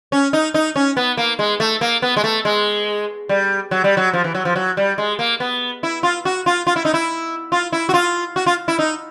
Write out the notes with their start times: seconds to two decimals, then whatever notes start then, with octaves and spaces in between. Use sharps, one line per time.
0.12 C#4
0.33 D#4
0.54 D#4
0.76 C#4
0.97 B3
1.17 A#3
1.39 G#3
1.60 A3
1.81 A#3
2.02 B3
2.17 G#3
2.24 A3
2.45 G#3
3.29 G3
3.71 F#3
3.84 G3
3.97 F#3
4.13 F3
4.24 E3
4.35 F#3
4.45 F3
4.56 F#3
4.77 G3
4.98 G#3
5.19 A#3
5.40 B3
5.83 E4
6.03 F4
6.25 F#4
6.46 F4
6.67 F4
6.76 E4
6.85 D#4
6.94 E4
7.52 F4
7.72 E4
7.89 F#4
7.94 F4
8.36 F#4
8.46 F4
8.68 E4
8.79 D#4